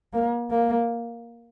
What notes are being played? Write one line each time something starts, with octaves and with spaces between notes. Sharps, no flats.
A#3
A#3